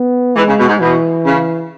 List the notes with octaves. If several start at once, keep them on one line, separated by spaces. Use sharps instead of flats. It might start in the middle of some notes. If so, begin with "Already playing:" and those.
Already playing: B3
E3 G#3
C#3
B2
G#2
B2 E3
C#3